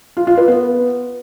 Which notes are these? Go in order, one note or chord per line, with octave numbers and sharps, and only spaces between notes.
F4
F4
B4
B3